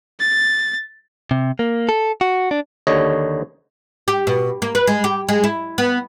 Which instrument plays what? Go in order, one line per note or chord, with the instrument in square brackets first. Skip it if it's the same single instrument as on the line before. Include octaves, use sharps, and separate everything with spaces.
[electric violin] A6
[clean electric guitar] C3
A#3
A4
F#4
D4
[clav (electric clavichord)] D#2 D3 C#5 D#5
[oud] G4
B2
A#3
B4
G#3
G4
G#3
E4
B3